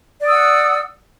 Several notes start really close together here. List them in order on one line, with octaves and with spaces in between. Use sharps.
D5 D#6 E6 F#5